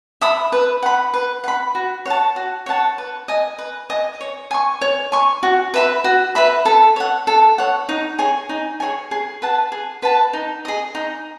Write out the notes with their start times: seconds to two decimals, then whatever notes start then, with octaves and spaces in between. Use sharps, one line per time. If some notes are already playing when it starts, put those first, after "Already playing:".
0.21 E5 B5 D#6
0.52 B4
0.82 F#5 B5
1.14 B4
1.44 F#5 B5
1.75 F#4
2.06 C#5 F#5 A5
2.36 F#4
2.66 C#5 F#5 A5
2.98 B4
3.28 D#5 G#5
3.59 B4
3.90 D#5 G#5
4.21 C#5
4.51 G#5 C#6
4.81 C#5
5.12 G#5 C#6
5.43 F#4
5.74 B4 E5 B5
6.04 F#4
6.35 B4 E5 B5
6.65 A4
6.96 C#5 F#5
7.27 A4
7.58 C#5 F#5
7.89 D#4
8.19 G#4 C#5 G#5
8.49 D#4
8.80 G#4 C#5 G#5
9.11 G#4
9.42 B4 F#5 A5
9.72 G#4
10.02 B4 F#5 A5
10.33 D#4
10.65 G#4 D#5
10.95 D#4